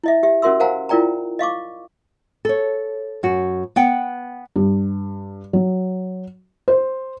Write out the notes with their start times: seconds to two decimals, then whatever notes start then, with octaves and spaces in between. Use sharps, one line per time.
0.04 E4 D#5 E5
0.23 G4 E5
0.42 C#4 F#4 A#4 E5 C6 E6
0.60 A#4 C5 F5 F#5 G#5 A#5
0.89 E4 F4 A#4 D5 G5 A#5
1.39 D#5 F5 C#6 D6
2.45 A4 C#5
3.23 F#2 F#4
3.76 B3 F#5 G5
4.56 G2
5.53 F#3
6.68 C5